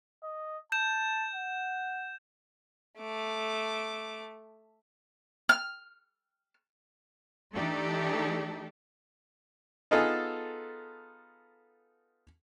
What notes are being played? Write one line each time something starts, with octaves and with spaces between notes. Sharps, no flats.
D#5
A5 G6 E7
F#5
A3 D6
F6
E3 A3 D4 D#4 G4 A4
B3 D#4 F4 G#4 A4